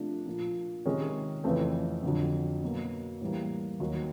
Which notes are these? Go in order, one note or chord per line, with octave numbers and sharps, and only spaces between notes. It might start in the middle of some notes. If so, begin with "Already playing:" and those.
Already playing: C3 F3 A3 D4
A#2 F3 A#3
C3 D#3 G#3 C#4
F2 C#3 E3 A3 C4
F2 D3 F#3
B2 F#3 A#3
A2 E3 G3 A#3
D#2 D#3 F#3